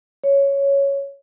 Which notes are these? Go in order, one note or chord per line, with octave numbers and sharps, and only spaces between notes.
C#5